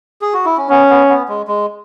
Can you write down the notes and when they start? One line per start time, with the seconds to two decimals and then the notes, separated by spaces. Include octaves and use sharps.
0.22 G#4
0.33 F#4
0.45 E4
0.58 C#4
0.70 B3 C#4
0.90 B3
1.09 B3
1.28 G#3
1.48 G#3